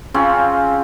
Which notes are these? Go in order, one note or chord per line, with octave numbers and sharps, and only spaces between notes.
C#3 C4 C#4 F4